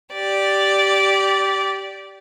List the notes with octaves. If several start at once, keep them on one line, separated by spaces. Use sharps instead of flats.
G4 D5